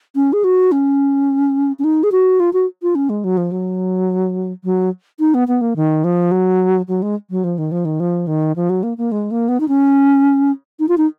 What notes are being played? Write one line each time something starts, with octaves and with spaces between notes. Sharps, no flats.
C#4
G#4
F#4
C#4
C#4
D#4
G#4
F#4
F4
F#4
F4
C#4
G#3
F#3
F3
F#3
F#3
D#4
B3
B3
A#3
D#3
F3
F#3
F#3
G#3
F#3
F3
D#3
F3
D#3
F3
D#3
F3
F#3
A#3
A#3
G#3
A#3
B3
D#4
C#4
D#4
F4
D#4